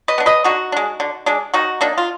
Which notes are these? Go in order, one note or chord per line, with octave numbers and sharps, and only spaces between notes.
B4 D#5
B3 D4
B4 D#5
D3 D#4 F#4
G#3 D4
D3
G#3 D4
D#3 D#4 F#4
A#3 D4 D#4
F4